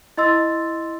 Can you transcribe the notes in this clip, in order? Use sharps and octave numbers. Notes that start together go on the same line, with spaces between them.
E4 D#5 C6 E6 A6